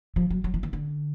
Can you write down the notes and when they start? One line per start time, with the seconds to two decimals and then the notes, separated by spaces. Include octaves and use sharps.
0.16 F3
0.30 F#3
0.44 F#3
0.54 E3
0.63 D#3
0.73 D3